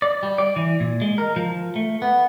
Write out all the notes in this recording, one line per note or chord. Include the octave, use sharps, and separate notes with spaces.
D5
G3
D5
E3
A#2
G#3
A#4
F3
A3
B3